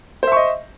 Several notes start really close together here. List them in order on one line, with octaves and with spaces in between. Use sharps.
C5 E5 C#6 D#5